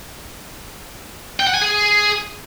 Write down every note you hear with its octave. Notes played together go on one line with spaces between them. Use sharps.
G5
F#5
G#5
G#4